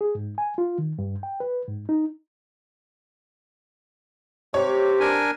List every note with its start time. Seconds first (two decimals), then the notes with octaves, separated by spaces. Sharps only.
0.01 G#4
0.15 G#2
0.38 G#5
0.58 F4
0.78 D#3
0.99 G2
1.23 G5
1.40 B4
1.68 G#2
1.89 D#4
4.54 C3 G4 C#5
5.00 D4 A#4 G#5